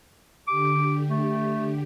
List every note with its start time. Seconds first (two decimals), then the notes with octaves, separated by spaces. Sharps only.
0.47 D3 G4 D6
1.10 A3